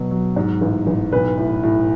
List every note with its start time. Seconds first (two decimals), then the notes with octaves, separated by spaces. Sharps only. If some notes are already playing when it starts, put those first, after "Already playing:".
Already playing: B2 F#3
0.11 F#3
0.36 G#2
0.61 A1
0.87 A1
1.13 B1 B4
1.38 A2
1.63 A2